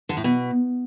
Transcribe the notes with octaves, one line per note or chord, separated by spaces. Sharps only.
D3
A2
B2